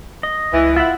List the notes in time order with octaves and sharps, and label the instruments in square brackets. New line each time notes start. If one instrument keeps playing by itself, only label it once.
[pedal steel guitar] D#5
[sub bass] C#2 [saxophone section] E3
[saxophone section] E4 E5 [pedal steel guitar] F4 F#5